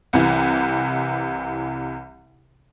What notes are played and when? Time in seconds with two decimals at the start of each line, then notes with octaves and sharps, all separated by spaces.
0.13 C2 C3 E3